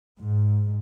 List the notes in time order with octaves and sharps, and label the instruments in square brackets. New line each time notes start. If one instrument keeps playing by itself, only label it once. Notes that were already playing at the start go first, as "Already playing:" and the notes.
[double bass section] G#2